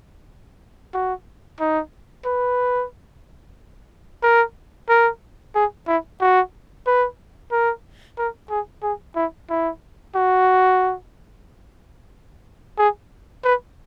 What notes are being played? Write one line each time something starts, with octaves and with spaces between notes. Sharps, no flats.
F#4
D#4
B4
A#4
A#4
G#4
E4
F#4
B4
A#4
A#4
G#4
G#4
E4
E4
F#4
G#4
B4